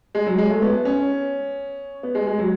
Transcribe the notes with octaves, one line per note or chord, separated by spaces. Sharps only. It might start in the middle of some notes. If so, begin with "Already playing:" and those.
G#3
F#3
G#3
A3
B3
C#4
B3
G#3
G#3
F#3